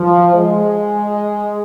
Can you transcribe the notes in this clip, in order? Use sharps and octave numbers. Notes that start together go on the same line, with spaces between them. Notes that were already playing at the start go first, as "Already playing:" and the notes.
Already playing: F3
G#3